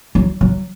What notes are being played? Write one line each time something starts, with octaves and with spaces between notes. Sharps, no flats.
F#3
F#3